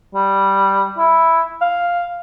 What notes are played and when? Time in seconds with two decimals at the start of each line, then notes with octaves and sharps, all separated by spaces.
0.14 G3
0.98 E4
1.62 F5